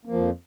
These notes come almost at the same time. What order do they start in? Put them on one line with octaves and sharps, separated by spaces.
A#3 F3 F2